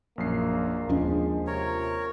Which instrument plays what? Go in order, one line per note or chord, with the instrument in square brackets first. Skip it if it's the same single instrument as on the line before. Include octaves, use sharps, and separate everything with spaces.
[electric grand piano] A#1 F#2 C7 [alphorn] A#3
[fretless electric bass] D#2 C#4 D4 [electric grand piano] F3 [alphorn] G#3
[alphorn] C3 [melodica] A#4 C#5